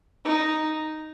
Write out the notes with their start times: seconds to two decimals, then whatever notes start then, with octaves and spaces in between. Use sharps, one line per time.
0.25 D#4